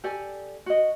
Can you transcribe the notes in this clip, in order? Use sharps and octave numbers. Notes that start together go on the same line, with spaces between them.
G4 A4 D5 G#5
F#4 D#5